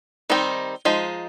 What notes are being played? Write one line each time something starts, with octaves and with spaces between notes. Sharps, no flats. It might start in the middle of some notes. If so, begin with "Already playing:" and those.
D#3 G3 C4 D#4
F3 G#3 D#4